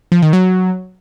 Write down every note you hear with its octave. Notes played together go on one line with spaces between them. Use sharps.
F3
D#3
F#3